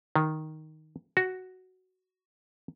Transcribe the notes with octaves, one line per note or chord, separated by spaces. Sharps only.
D#3
F#4